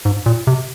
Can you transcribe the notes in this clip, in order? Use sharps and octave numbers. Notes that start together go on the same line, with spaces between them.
G#2
A#2
C3